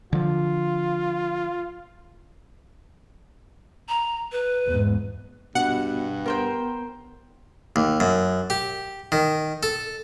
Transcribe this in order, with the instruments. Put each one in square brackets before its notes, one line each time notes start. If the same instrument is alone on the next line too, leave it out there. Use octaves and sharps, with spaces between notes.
[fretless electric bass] D3 F3 [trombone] F4
[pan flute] A#5
B4
[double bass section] E2 G#2
[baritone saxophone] G2 [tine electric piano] B2 [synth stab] F#5
[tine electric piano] B3 [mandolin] A#4 C5 G5
[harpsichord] D#2
F#2
G4
D#3
A4